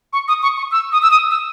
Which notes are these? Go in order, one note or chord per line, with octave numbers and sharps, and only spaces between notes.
C#6
D#6
C#6
C#6
E6
D#6
E6
D#6
E6